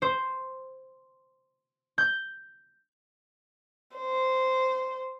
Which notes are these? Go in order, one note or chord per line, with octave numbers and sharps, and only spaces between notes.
C5
G6
C5